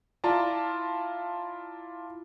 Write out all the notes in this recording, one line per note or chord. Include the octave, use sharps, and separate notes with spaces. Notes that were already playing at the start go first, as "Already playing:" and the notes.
E4 F4 D5 A5 A#5